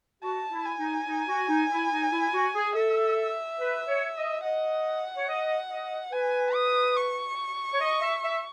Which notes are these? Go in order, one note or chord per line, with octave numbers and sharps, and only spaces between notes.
F#4 A5
E4
G#5
D#4
D#4
F#4
D#4
E4
D#4
E4
F#4
G#4
A4 E5
B4
C#5
D#5
D#5 F#5
C#5
D#5
D#5
B4 G#5
D#6
C#6
C#5
D#5
E5
E5